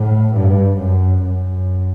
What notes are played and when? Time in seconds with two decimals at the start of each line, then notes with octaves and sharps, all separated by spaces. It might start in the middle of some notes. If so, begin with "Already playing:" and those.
Already playing: A2
0.36 G2
0.79 F#2
1.23 F#2